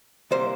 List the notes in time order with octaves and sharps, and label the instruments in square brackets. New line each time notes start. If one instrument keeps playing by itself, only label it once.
[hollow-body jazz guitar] C2 C3 G3 A#3 C5